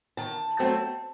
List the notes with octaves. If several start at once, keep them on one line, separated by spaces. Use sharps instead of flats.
D#3 A5
F#3 A3 C4